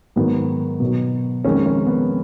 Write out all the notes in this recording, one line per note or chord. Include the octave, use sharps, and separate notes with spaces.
G#2 D#3 F#3 B3
B2 F#3
F2 D#3 G#3 C#4
C#4
B3